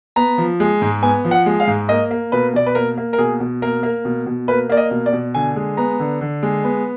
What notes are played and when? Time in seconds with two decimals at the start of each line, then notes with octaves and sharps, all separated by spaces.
0.16 B3 A#5
0.38 F3
0.60 G#3
0.82 G#2
1.02 B3 G#5
1.25 F3
1.31 F#5
1.46 G#3
1.60 F5
1.67 G#2
1.89 A#3 D#5
2.11 A#3
2.32 B2 B4
2.54 B2 D5
2.66 B4
2.75 A#3 A#4
2.98 A#3
3.13 A#4
3.18 B2 G#4
3.40 B2
3.62 A#3 A#4
3.83 A#3
4.05 B2
4.26 B2
4.48 A#3 B4
4.69 A#3 D5
4.77 D#5
4.91 B2
5.06 D5
5.13 B2
5.34 D3 G#5
5.56 G#3
5.77 B3 A#5
6.00 D3
6.21 D3
6.43 G#3
6.64 B3